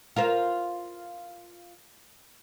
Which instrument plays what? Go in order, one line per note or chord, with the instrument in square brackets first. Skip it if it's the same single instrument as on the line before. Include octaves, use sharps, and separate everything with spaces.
[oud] F4 A#4 C5